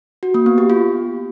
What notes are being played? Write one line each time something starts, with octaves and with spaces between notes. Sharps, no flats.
F#4
A#3
B3
G4
F4